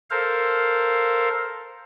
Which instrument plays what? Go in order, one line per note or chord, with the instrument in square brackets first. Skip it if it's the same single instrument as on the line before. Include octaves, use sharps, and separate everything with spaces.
[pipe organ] A4 A#4 C5 F5